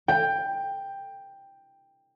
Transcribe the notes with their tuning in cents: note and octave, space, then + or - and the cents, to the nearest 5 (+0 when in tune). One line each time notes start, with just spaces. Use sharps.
G5 +10